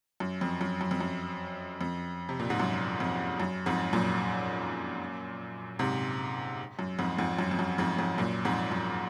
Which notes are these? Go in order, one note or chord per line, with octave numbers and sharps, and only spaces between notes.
F#2
F2
F#2
F#2
F2
F#2
F2
C3
A#2
G#2
F#2
F2
F#2
F2 G#2
F#2 A#2
G#2 C3
F#2
F2 G#2
F2 G#2
F#2
F2
F#2
F2 G#2
F2 G#2
F#2 A#2
F2 G#2
F#2